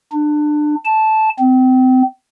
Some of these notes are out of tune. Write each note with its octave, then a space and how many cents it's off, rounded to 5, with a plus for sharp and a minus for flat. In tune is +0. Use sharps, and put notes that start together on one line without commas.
D4 +25
A5 -10
C4 -30